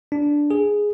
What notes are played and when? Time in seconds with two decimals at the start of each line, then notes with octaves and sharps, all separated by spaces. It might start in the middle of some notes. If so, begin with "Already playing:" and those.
0.12 D4
0.51 G#4